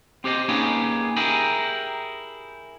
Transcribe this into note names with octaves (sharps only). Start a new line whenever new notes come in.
C4 G4 C5 D#5
A#3 C#4 D#4 G4 G#4 B4
E4 G4 G#4 A#4